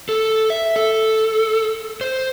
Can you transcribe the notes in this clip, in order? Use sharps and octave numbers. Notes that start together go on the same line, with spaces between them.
A4
E5
A4
C5